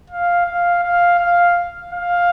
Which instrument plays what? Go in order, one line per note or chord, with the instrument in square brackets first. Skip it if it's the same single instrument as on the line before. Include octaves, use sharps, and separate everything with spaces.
[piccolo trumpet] F5
F5
F5
F5
F5